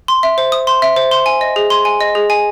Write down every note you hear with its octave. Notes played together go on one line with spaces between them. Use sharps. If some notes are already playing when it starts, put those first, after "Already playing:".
C6
E5
C5
D#6
C6
E5
C5
C6
G#5
D#5
G#4
C6
G#5
D#5
G#4
G#5